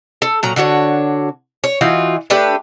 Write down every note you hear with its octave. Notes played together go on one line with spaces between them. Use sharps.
A4
A#2 F#3 A#5
D3 D4 F#4 C#5
C#5
E3 D#4 F4 F#4
A3 D4 G4 B4